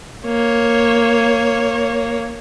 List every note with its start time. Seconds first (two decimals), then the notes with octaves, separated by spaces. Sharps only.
0.25 A#3 C#5